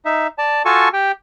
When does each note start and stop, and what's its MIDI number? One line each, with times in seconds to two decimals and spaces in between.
0.05 0.27 63
0.05 0.27 76
0.38 0.62 74
0.38 0.62 81
0.65 0.89 65
0.65 0.89 66
0.65 0.89 69
0.65 0.89 80
0.65 0.89 81
0.65 0.89 85
0.93 1.12 67
0.93 1.12 79